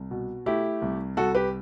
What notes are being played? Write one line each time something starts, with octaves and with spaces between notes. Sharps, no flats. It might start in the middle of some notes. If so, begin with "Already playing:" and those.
Already playing: C2
B2
A3 E4 G4
C2
C2 F#4 A4
G4 B4